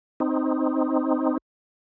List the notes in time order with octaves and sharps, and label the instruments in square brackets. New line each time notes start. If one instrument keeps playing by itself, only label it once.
[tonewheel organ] C4 D#4